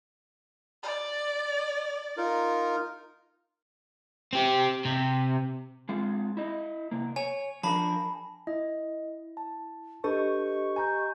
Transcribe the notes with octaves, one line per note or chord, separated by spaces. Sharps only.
D5
D#4 F4 A#4
C4 G4
C3
G#3 C4 F4
E4 D#5
C3 A#3
C#5 G#5
F3 D4 A#4 A5 B5
E4 D#5
A5
D4 G4 A4 B4 D#5 C#6
G#5 A#5 G6